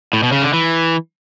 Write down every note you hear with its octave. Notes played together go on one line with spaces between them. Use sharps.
A2
B2
C#3
D3
E3